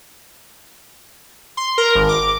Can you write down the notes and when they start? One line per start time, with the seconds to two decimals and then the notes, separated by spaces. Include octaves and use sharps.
1.57 C6
1.78 A#4
1.95 G#1
2.09 D6